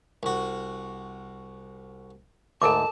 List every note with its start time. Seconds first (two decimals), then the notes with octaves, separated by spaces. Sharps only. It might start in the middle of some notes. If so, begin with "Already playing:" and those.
0.23 C2 F#4
2.62 D2 G#2 A4 A#4 A5 D6